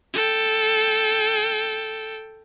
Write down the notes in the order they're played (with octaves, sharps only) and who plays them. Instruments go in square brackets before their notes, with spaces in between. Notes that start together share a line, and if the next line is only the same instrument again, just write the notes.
[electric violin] A4 G5